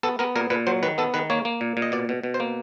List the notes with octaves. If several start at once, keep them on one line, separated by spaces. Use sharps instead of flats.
B3 A4
B3 A#4
A#2 A#4
A#2 B4
F#3 C5
D#3 B4
B3 A4
D#3 B4
A#3 C#5
A#3
A#2
A#2
D#5
B2 D5
B2
B2
C5
A#3